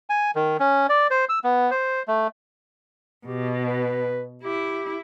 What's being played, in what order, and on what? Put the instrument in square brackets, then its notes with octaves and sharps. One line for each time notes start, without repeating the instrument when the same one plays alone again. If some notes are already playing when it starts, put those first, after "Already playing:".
[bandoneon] G#5
D#3
C#4
D5
C5
E6
B3
C5
A3
[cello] B2 [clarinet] G4
[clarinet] B4
[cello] E4 [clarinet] G4